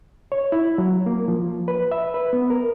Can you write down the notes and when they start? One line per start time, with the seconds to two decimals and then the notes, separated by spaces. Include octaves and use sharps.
0.32 C#5
0.52 E4
0.78 F#3
1.06 A#3
1.28 F3
1.68 B4
1.92 E5
2.14 B4
2.33 B3
2.50 A#4